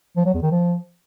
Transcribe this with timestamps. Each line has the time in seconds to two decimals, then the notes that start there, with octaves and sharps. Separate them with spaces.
0.17 F3
0.25 F#3
0.34 E2
0.42 D#3
0.51 F3